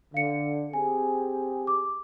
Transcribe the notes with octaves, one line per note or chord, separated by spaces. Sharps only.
D3 F5 C#7
C4 G4 G#4 G#5
D6